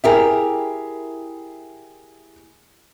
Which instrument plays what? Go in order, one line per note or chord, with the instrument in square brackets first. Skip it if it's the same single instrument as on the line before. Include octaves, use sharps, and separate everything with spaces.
[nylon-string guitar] E4 G4 A#4 [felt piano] G#4 E5